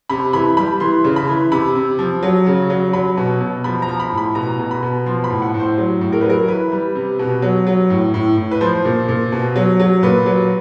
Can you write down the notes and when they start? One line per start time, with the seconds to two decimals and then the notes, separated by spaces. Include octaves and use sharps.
0.09 C3 B5
0.33 E3 B5
0.57 G3 B5
0.80 E3 C6
1.04 C#3
1.16 B5
1.28 E3
1.52 C3 B5
1.75 C3
1.99 F3
2.23 F#3
2.46 C#3
2.70 F#3
2.93 F#3 B5
3.17 B2
3.40 B2
3.64 F3 B5
3.82 A#5
3.88 F3
4.00 B5
4.12 A2
4.18 B5
4.35 B2 A#5
4.59 B2
4.71 B5
4.83 B2
5.06 F3 C6
5.24 B5
5.30 A2
5.42 F#5
5.54 A2
5.59 C5
5.78 F#3
6.01 A2
6.12 A#4
6.21 B4
6.25 F#3 A#4
6.48 E3 B4
6.72 G3
6.95 C3
7.19 B2
7.42 F#3
7.67 F#3
7.90 A2
8.14 A2
8.37 A2
8.51 B4
8.61 F3 C5
8.85 A#2
9.08 A#2
9.32 B2
9.56 F#3
9.80 F#3
10.03 A#2 B4
10.26 F#3